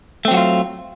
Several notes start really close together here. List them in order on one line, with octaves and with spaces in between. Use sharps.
A3 C4 F#3 F#4 F4